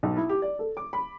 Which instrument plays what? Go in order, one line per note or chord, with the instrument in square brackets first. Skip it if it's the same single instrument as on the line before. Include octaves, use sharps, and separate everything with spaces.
[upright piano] B1
E4
G4
D5
A4
D6
B5